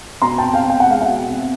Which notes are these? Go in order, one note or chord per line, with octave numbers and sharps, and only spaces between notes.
B2 A#5 C6
G5 A5
C4
F5 G5
B2 G5
F#5
G#3 F5
E5 F#5
B2
C4